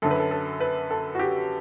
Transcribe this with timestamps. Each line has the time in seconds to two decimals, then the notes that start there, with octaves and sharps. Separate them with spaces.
0.02 F#2 D3 F#3 A4
0.11 B4
0.20 A4
0.31 A4
0.60 B4
0.90 A4
1.15 F#4
1.19 G4